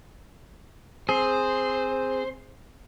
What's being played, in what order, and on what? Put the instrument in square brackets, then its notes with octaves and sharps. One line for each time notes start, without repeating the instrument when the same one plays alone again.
[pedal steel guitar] C4 G#4 [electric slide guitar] C5